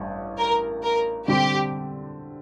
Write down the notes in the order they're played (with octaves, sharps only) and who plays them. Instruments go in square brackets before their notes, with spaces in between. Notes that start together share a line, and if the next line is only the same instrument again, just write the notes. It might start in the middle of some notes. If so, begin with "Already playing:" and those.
Already playing: [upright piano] A1 G2
[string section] A#4
A#4
[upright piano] D3 G3 C4 [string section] G4